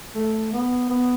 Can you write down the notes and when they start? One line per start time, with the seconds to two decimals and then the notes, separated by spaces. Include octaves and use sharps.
0.15 A3
0.53 B3
0.90 B3